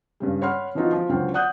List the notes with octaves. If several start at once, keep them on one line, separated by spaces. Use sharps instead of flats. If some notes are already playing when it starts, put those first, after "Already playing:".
G2 C#3 G3
C#5 F#5 B5 C6 F6
D3 E3 F3 D#4 F4 F#4
F3
C#2 D3 F#3 C5 G5 F6
D5 F#5 D#6 F#6 G6